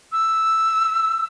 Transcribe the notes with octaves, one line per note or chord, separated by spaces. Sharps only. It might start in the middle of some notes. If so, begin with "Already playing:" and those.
E6